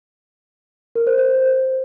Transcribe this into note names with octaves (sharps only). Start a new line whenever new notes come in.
A#4
C5
C5